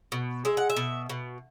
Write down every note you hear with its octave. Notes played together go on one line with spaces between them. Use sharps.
B2
G#3 E5
F#5
E5
B2
B2